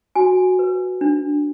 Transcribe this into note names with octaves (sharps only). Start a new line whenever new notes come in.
F#4 G#5
B4
D4